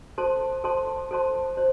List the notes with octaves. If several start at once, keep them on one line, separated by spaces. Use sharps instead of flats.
A4 C5 A5 C6
A4 C5 A5 C6
A4 C5 A5 C6
C5